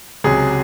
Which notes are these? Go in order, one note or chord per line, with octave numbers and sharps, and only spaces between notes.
C#2 C3 F#3 G#4